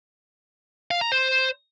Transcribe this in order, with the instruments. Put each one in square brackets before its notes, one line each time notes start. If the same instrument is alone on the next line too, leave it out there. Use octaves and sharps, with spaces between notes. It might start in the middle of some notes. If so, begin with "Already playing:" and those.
[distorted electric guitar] F5
A#5
C5